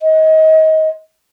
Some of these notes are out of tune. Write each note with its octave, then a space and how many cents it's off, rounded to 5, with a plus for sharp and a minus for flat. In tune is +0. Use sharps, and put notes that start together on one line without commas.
D#5 +25